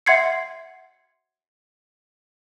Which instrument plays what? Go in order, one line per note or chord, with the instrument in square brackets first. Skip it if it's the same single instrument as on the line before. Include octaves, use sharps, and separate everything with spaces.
[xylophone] E5 F#5 C6 G#6 C7 C#7